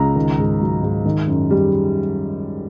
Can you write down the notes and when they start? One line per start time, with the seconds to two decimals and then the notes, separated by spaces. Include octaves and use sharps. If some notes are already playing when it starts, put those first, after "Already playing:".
Already playing: C#2 A#5
0.16 D#3
0.38 G#2
0.61 F#3
0.83 G#2
1.05 D#3
1.28 F#2
1.50 G3